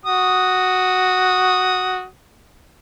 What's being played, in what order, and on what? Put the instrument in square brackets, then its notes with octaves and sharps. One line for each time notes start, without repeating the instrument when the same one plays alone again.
[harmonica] F#4 D#6